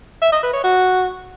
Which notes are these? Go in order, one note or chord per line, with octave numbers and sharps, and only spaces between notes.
E5
D#5
B4
C#5
F#4